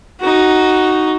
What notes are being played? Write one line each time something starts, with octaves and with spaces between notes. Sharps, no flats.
D#4 F#4